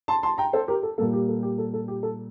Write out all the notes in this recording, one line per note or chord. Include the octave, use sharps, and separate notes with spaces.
A5 C6
A5 C6
G5 A#5
A4 C5
G4 A#4
A4
A#2 G3 A#3 A4
G4
A4
G4
A4
A4
G4
A4